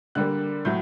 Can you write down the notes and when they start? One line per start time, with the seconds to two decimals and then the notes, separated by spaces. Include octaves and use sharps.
0.15 D3 G3 A#3 F#6
0.65 A2 F#3 G6